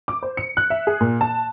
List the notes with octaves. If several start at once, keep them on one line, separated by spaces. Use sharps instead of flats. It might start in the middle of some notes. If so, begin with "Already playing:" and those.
D6
C5
C#7
F#6
E5
G#4
A#2
A5